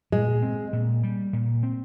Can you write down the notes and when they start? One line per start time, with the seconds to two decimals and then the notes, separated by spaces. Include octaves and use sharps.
0.12 A#2 G#3
0.43 C4
0.73 A#2
1.03 G3
1.33 A#2
1.63 C4